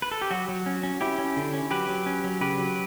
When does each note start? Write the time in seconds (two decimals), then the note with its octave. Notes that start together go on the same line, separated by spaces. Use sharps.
0.02 B4
0.11 A4
0.22 G4
0.30 F#3 F#4
0.49 F#3
0.66 C#4
0.83 C#4
1.01 C#4 E4 G4
1.19 C#4
1.37 D3
1.53 C#4
1.71 F#3 G4 B4
1.89 F#3
2.06 C#4
2.24 F#3
2.41 C#3 G4 B4
2.59 F#3